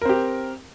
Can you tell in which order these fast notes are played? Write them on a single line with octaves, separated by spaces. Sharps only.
A#4 C4 G4